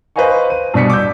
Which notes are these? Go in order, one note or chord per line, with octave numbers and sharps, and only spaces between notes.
B4 C5 D#5 F5 G#5 C#6
D#7
G2 B2 D5 B6 C#7
D6 E6 G6